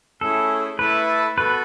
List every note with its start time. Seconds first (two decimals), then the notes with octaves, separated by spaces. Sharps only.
0.21 A3 C#4 E4 G#4 A4
0.79 A3 E4 A4 B4 E5 A5
1.38 B3 F#4 A4 B4